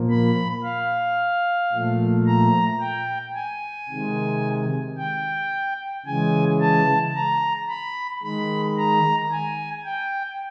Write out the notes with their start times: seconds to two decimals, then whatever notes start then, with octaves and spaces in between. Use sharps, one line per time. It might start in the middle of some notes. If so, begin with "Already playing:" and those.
Already playing: A#2 F3 A#3
0.10 B5
0.63 F5
1.72 A#2 F3 A3
2.26 A#5
2.81 G5
3.35 G#5
3.89 C3 D#3 G#3
4.98 G5
6.06 C#3 E3 G#3 G#5
6.60 A5
7.15 A#5
7.69 B5
8.23 D#3 G#3 B5
8.77 A#5
9.31 G#5
9.85 G5